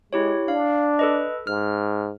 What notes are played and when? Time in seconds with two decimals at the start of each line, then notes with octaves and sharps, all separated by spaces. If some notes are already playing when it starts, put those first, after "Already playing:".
0.13 G#3 E4 G4 C#5
0.48 D4 F5
0.99 A4 B4 D#5
1.47 G#2 F6